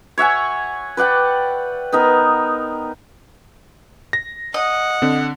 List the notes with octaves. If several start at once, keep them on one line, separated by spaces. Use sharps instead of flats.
C#5 E5 F#5 G#5
B4 D5 F#5 G5
B3 D#4 A#4
A#6
D#5 F#5
D3 C4